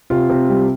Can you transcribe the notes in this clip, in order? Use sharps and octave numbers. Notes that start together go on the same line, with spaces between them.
C3 F4
C3
G3